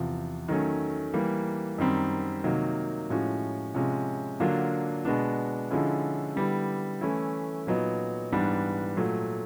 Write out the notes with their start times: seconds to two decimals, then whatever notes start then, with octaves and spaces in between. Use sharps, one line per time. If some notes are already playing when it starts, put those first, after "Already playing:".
Already playing: E2 C3 F3
0.48 D#3 F#3 A3 C#4
1.14 E3 G3 A#3
1.78 F#2 D#3 G3 C4
2.44 C3 D#3 F#3 A#3 D#4
3.10 A2 F3 G#3 C#4 F#4
3.74 C3 F3 G#3 C#4
4.40 D3 F#3 A#3 D4 F4
5.05 B2 G#3 B3 D4
5.71 D3 F3 G#3 C#4 E4
6.36 D3 G3 B3 E4 G4
7.01 E3 A3 C#4 E4
7.67 A#2 F#3 B3 D#4
8.32 G#2 E3 G3 B3 D4
8.97 A#2 F#3 A3